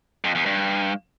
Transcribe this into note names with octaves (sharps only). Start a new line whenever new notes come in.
F2
E2
G2